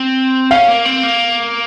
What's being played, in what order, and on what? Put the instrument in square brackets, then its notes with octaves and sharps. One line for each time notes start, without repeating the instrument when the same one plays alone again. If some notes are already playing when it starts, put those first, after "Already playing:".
Already playing: [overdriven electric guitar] C4
[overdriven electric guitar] C#4 [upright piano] F5
[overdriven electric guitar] A#3
C4
A#3